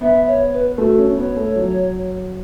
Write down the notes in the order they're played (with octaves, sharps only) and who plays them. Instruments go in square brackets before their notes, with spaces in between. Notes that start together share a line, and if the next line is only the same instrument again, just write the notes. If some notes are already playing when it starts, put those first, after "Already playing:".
[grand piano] B3 [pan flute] E5
[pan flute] C#5
B4
[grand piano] A3 [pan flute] F#4
[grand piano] C#4
[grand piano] B3 [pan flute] C#5
[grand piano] A3
F#3